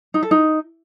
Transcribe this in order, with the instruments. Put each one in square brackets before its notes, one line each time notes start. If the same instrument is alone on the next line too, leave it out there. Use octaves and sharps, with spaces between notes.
[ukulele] D#4
A4
D#4